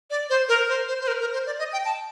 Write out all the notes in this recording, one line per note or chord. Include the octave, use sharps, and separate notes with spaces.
D5
C5
A#4
C5
C5
C5
A#4
A#4
C5
D5
D#5
G5
A5